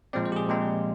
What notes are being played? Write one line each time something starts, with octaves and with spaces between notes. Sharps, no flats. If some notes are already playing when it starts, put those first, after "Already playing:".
A#2 F3 G#3 C4 D5
C5
G4
G#4
A#2 F3 G#3 C4